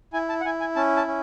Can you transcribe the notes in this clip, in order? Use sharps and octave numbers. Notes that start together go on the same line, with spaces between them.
E4 G#5
A5
F#5
E4 G#5
G#5
C#4 A5
A5
C#4